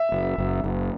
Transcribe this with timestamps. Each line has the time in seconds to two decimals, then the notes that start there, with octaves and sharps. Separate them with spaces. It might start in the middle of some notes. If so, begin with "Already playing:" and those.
Already playing: E5
0.12 F#1
0.38 F#1
0.64 F#1